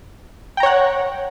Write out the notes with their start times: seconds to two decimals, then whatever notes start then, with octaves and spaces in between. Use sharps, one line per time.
0.57 G5
0.60 A#5
0.63 C#5
0.66 F#5